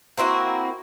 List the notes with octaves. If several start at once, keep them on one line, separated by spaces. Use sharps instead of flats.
A#3 C4 E4 F#4